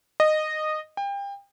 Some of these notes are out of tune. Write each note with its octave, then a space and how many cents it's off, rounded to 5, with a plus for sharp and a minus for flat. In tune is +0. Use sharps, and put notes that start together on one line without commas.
D#5 -15
G5 +30